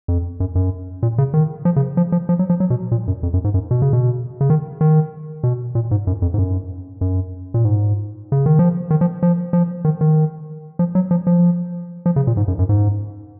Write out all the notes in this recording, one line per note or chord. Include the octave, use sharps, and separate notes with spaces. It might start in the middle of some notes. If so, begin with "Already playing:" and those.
F2
F#2
F#2
A#2
C#3
D#3
F3
C#3
F3
F3
F3
F#3
F3
F#3
B2
A#2
F#2
F2
F#2
G#2
F#2
B2
C#3
B2
C#3
D#3
D#3
B2
A#2
G#2
F#2
F2
G#2
F#2
F#2
A#2
G#2
C#3
D#3
F3
D#3
F3
F3
F3
D#3
D#3
F3
F#3
F3
F3
F3
C#3
A#2
G#2
F#2
F#2
G#2